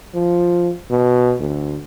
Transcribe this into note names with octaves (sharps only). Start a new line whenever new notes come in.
F3
B2
D2